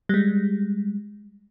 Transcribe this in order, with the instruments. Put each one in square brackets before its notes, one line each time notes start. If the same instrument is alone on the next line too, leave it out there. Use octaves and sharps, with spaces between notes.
[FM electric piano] G3 G#3